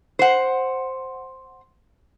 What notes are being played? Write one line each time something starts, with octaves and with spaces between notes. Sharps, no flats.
C5 F#5